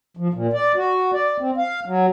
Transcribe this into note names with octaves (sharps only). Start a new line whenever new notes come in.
F3
A#2
D5
F#4
D5
C4
F5
F#3